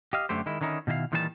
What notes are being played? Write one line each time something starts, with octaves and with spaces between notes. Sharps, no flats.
G4 D#5 F5
F#2 D3 A3 G4 C5
D#3 G#3 E4
D3 D#3 C#4 D#4 E4
B2 D#3 E4 A4 F5
A#2 D#3 E3 G3 D4 A5